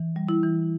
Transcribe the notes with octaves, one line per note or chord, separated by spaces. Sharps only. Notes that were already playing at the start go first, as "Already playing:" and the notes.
Already playing: E3
G3
E4
E3